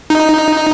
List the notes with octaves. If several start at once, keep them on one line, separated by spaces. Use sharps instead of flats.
D#4